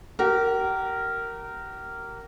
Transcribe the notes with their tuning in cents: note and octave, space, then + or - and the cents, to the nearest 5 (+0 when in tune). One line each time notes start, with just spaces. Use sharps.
G4 -40 A#4 -10 F#5 -15